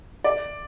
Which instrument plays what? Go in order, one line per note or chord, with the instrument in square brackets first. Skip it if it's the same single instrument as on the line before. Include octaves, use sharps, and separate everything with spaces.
[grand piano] D5